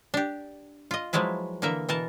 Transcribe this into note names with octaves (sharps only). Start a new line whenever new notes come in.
D4 G4
F4 D#5
F3 F#3 G#3 E4 B4
D3 E3 A#3 A#4 E5
B2 E3 A#4 A5